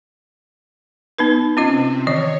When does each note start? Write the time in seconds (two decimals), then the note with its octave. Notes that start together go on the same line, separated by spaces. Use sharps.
1.18 B3 D#4 B4
1.57 C3 C4 C#4 F4 D#5
2.07 D#3 E3 C#5 D#5